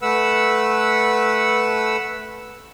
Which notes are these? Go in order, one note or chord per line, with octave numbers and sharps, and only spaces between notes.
A3 B4 F#5 E6